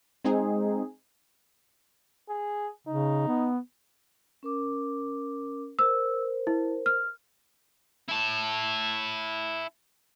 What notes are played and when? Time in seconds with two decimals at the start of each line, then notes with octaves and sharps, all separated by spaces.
0.24 G#3 C4 D#4 G#4
2.29 G#4
2.87 C#3 D#4
3.28 B3
4.43 C#4 A#4 D6
5.79 A#4 C5 E6
6.47 E4
6.86 F6
8.09 E4 A5